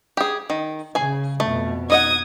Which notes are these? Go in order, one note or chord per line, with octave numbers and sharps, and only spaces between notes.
G4 G#4
D#3
C#3 G#4 G#5
F2 B2 A3
D#4 D#5 F#5 D#6 G#6